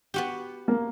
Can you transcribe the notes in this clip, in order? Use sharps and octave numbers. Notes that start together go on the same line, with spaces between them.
B3 F#4 G4
A#3